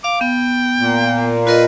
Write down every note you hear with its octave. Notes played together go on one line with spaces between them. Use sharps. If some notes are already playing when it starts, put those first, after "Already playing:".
F5 D6
B3 G5
A#2
F4 A#4 B4 D#5